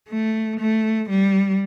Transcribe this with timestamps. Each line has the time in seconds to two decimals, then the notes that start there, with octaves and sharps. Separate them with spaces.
0.08 A3
0.59 A3
1.09 G3